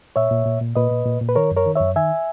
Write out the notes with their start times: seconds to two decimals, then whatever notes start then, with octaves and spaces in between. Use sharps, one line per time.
0.16 A#2 C#5 E5
0.31 A#2
0.46 A#2
0.61 A#2
0.76 A#2 B4 D#5
0.91 A#2
1.06 A#2
1.21 A#2
1.29 B4
1.36 D#3 A#4 C#5
1.51 F#2
1.56 A#4 C#5
1.66 D#3
1.75 F#2 C#5 E5
1.96 D#3 E5 G#5